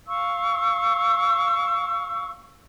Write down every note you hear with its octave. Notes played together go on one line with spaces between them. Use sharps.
F5 C#6 E6